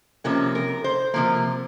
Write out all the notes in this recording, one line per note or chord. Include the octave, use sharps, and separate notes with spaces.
C3 F3 A#3 C#4
A#4
C5
C3 F3 A#3